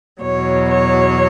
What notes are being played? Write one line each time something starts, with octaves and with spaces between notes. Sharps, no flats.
E2 B2 F#3 C#5
C#5